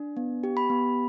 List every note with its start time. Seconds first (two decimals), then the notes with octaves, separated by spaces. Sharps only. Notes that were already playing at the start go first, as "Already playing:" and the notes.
Already playing: D4
0.17 B3
0.43 G4
0.57 B5
0.70 B3